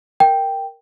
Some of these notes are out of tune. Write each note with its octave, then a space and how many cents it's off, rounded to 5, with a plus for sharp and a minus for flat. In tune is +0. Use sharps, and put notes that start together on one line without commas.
A#4 +0 G5 +0